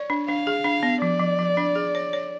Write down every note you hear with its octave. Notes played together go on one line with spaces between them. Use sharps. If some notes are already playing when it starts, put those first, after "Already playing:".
Already playing: C#5 D5
D4
D4 F5
G#4
D4
B3
F3 D5
F3
F3
D4
G#4
C#5
C#5